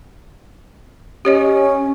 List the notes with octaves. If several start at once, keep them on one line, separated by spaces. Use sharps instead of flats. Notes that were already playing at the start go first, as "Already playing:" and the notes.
C#4 G4 C#5 D#5